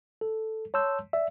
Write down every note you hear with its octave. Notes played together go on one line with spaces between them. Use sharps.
A4
C#5 A5 C6 E6 G6
D5 E5